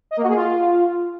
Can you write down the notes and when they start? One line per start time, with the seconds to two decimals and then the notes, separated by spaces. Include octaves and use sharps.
0.11 D#5
0.17 A#3
0.23 F#4
0.29 G#4
0.35 F4